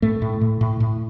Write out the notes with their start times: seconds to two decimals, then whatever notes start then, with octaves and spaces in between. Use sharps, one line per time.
0.02 A2 A3
0.22 A2
0.41 A2
0.61 A2
0.80 A2